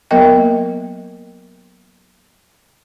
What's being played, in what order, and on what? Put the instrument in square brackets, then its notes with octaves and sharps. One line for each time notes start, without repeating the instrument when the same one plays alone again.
[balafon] F#3 A#3 B3 A#4 D#5 G5